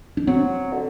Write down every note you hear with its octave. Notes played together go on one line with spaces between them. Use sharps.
D4
F#3 C4
D3